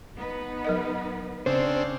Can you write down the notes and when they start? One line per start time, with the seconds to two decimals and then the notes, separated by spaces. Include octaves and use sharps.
0.17 B3 D#4 B4
0.65 F#3 A#4 D#5
1.46 C#3 C4 D4 C5